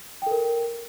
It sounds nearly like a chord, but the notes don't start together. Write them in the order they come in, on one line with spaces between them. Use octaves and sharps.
G5 A4 A#4